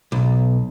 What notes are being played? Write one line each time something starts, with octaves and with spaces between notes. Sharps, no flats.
B1